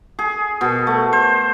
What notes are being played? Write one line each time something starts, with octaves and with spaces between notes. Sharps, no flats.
G#4
B2
A3
C5